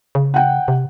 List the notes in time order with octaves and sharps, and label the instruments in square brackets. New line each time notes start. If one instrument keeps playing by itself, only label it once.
[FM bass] C#3
[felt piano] F#5 G5
[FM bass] C3